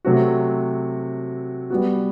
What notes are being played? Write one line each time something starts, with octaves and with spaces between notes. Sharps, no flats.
C3 F#3 A3 C4 F#4
G3 B3 F#4